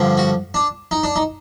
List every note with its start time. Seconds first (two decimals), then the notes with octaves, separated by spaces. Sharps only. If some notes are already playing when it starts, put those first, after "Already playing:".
Already playing: G2 D3 F3
0.17 F#4
0.54 D4
0.91 D#4
1.03 D4
1.16 D#4